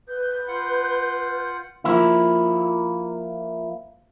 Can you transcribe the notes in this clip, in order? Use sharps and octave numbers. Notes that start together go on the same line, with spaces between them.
B4 G6
F4 F#5
F3 A#3 E4